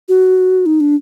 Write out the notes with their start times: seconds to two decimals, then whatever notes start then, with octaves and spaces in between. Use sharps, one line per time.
0.09 F#4
0.66 D#4
0.80 D4